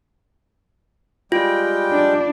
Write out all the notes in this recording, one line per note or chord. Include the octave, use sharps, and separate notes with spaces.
G3 G#3 F4 G5
D4